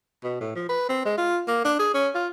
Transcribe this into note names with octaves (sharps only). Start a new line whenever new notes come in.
B2
A2
F3
B4
C4
G#3
F4
A#3
D4
G#4
C#4
F4